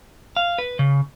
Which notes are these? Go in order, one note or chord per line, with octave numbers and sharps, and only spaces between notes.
F5
B4
C#3